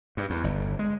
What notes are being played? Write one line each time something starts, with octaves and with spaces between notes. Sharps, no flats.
G2
E2
G1
G#3